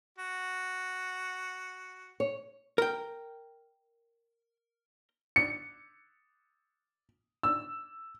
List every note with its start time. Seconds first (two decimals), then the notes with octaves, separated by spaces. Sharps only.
0.18 F#4
2.20 C#5
2.78 A#4 G5
5.36 C#7
7.43 E6